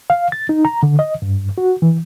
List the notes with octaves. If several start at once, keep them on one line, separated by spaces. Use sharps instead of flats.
F5
A6
D#4
A#5
D3
D#5
G2
F#4
E3